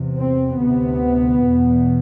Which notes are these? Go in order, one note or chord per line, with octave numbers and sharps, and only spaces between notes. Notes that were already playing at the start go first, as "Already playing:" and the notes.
Already playing: E2 C3
C4
D2 C3 B3
E2 B2